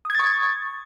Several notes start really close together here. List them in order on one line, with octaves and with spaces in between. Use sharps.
D#6 G#6 A6 C#6